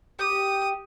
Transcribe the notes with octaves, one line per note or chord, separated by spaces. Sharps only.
G4 D#6